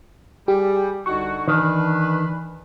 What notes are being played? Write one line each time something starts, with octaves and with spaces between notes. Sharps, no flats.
G3 G4 G#4
C2 D3 D#4 F#4 C#6
D#3 E3 D4 B4